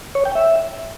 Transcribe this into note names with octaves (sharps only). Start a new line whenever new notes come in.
C#5
G5
E5